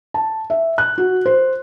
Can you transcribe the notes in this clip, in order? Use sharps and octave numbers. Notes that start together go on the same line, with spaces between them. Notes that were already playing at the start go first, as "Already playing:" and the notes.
A5
E5
F#6
F#4
C5